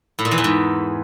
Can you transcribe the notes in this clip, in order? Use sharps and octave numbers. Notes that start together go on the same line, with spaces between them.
A2
A#2
E3
E2
G#2